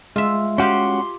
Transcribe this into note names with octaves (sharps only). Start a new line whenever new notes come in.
G#3 F4 E5
C#4 F#4 G4 F5 G5 C6